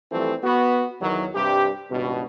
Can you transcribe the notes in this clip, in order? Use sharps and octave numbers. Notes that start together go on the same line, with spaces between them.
E3 F3 G3 A3 C4 A4
B3 F#4
E2 D#3 F#3
G2 C3 G3 G4
G#1 C#2 G2 B2